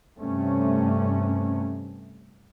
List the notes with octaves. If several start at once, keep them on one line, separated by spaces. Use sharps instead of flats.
G2 C3 A3 C#4